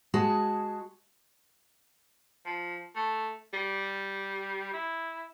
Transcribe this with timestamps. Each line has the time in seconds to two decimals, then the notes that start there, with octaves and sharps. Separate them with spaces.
0.14 G#3 F#4 G#4 A5
2.46 F3
2.96 A3
3.53 G3
4.73 E4